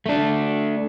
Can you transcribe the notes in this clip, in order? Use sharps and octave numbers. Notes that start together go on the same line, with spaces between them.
A3 D4